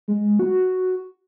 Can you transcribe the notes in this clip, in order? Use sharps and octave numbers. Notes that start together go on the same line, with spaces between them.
G#3
F#4